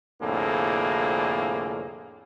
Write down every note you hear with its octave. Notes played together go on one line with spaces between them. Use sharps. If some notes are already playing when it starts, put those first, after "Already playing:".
C2 F2 A2 D3 A#3 G#4